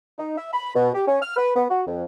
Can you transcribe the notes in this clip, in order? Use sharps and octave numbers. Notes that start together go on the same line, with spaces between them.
D#4
E5
B5
B2
G4
C#4
F6
B4
B3
F#4
F2